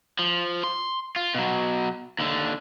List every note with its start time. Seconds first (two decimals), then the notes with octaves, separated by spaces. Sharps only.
0.19 F3
0.64 C6
1.16 F4
1.35 B2 F#3
2.19 D#2 D3